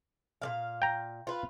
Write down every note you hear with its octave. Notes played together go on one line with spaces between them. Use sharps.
A#2 G#3 F5
G5 A#5
F4 B4